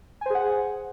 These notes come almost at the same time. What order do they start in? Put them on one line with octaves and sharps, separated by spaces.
G#5 C5 G#4 F#5